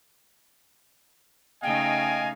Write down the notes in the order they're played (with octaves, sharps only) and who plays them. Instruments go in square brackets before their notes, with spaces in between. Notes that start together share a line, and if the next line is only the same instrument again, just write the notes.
[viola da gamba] C#3 A3 D#4 [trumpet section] D#5 F5 G#5 [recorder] G5